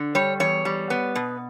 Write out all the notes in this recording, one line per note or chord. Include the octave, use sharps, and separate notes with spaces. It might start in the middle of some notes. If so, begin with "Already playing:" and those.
Already playing: D3
G3 C#5
E2 C#5
G3
B3
B2